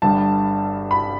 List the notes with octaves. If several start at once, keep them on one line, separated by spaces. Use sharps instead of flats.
G1 G2 G3 D4 A5
B5